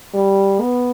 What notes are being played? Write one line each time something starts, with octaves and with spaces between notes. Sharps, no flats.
G3
B3